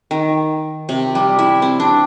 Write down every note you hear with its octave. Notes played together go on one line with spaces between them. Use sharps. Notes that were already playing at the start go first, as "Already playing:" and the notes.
D#3
C3
G3
E4
C4
D4